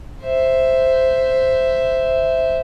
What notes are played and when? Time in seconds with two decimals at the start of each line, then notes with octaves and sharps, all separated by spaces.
0.22 C5 E5